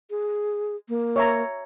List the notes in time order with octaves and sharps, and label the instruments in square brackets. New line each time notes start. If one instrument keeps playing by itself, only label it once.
[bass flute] G#4
A#3
[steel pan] C#5 E5 A#5